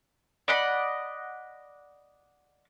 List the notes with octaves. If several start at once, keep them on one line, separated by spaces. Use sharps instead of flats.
D5 D#5 F#5 B5